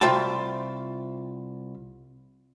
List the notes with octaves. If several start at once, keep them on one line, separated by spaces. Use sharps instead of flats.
C2 F4 E5 G5 A5